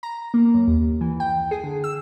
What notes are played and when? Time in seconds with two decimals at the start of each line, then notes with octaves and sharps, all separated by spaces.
0.03 A#5
0.34 A#3
0.54 F#2
0.67 D#2
1.01 E3
1.20 G5
1.51 G#4
1.64 D3
1.84 E6